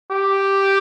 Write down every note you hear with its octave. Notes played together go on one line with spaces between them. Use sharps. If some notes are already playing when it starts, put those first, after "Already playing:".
G4